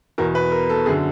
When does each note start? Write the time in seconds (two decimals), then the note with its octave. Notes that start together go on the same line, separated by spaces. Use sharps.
0.18 E2 B2 A#4
0.35 B4
0.52 A#4
0.69 A4
0.86 F#2 D3 G#4